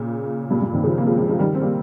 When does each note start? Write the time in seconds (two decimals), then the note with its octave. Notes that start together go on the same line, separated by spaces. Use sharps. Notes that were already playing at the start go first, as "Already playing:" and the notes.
Already playing: A#2 C#3
0.50 G2 A#2
0.62 G2
0.73 C3 D#3
0.84 C#3 F3
0.97 A#3
1.06 F3 G#3
1.17 F3 G#3
1.28 F3 G#3
1.39 D#3 G3
1.55 C4
1.61 G3 A#3